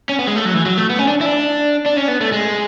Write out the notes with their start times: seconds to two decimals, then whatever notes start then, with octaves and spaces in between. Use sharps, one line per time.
0.09 C#4
0.19 B3
0.27 G#3
0.36 A3
0.45 F#3
0.54 E3
0.66 F#3
0.77 A3
0.90 B3
0.99 C#4
1.08 D4
1.21 E4
1.26 D4
1.86 D4
1.97 C#4
2.08 B3
2.21 A3
2.32 G#3